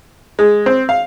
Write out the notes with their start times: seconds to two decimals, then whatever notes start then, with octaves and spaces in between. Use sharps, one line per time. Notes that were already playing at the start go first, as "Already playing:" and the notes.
0.39 G#3
0.66 C4
0.89 F5